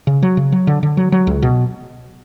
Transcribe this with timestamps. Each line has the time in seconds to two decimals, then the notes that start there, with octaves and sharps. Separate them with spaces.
0.07 C#3
0.22 F#3
0.37 C#3
0.52 F#3
0.67 D3
0.83 D3
0.97 F#3
1.12 F#3
1.27 C#2
1.42 B2